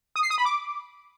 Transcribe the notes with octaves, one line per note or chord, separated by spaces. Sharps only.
D#6
C7
D#6
B5
D6